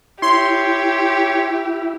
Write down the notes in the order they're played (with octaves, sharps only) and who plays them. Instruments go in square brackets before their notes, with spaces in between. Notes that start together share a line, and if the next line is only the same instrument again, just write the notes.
[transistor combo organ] E4 [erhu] G4 [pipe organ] C#5 [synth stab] C6